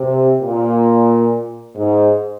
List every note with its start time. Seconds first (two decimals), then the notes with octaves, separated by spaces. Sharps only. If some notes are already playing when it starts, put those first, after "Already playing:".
Already playing: C3
0.39 A#2
1.75 G#2